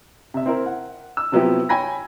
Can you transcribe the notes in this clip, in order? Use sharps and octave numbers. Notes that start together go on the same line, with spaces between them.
C3 E5
C4 E4 A#4
F#5
E6
C3 F3 F#3 B3 E4 G4
C#5 G5 G#5 B5 G#6 A#6